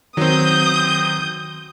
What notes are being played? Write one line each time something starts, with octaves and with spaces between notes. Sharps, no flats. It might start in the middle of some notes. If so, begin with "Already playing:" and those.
D#3 F#3 C4 D#6 G6